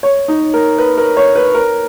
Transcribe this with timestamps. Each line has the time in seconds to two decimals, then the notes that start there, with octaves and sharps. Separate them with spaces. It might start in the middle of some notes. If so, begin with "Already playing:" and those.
0.03 C#5
0.28 D#4
0.54 A#4
0.78 B4
0.98 A#4
1.17 C#5
1.35 B4
1.55 A#4